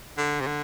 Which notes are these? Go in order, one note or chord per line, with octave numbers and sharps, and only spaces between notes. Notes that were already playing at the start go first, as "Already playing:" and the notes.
D3
C3
D3